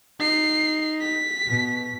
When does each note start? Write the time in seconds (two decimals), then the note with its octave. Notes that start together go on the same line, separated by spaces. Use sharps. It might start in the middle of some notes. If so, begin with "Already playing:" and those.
0.20 D#4 C7
1.02 B6
1.47 B2